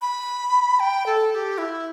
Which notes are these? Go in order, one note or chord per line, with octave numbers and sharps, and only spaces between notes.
B5
G5
A4
A4
G4
E4